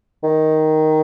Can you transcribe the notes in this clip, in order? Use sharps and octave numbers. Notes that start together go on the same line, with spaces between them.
D#3